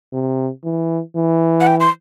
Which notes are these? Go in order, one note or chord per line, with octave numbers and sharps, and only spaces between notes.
C3
E3
E3
F#5
G5
C6